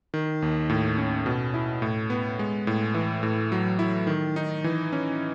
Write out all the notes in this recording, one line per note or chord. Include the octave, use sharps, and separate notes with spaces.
D#3
D#2
A2
C#4
B2
E4
A2
B3
G#3
A2
E3
A2
F#3
E4
D#3
D#4
E3
C#4